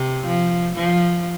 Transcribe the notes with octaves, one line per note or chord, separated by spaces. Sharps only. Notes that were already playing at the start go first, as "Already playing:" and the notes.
Already playing: C3
F3
F3